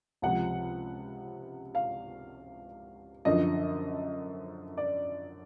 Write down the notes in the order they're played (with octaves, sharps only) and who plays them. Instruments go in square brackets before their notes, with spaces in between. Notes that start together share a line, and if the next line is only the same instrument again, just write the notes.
[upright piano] C#2 C3 F3 F#5
F5
F#2 D3 F3 D#5
D5